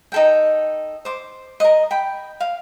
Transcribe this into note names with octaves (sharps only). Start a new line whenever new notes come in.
D#4 A4 G5
C5 D6
A#4 D#5
G5 B5
F5